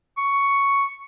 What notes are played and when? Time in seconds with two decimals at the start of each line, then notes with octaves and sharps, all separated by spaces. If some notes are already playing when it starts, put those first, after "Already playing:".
0.18 C#6